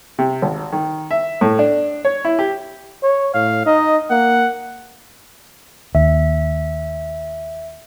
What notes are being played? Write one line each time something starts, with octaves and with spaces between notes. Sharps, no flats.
C3
G#1
D#3
E5
A2
D4
C#5
E4
G4
C#5
A2 F5
D#4 D#5
A#3 F#5
D#2 E5